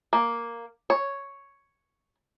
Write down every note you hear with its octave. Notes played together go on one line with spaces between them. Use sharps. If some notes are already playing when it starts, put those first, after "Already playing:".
A#3
C#5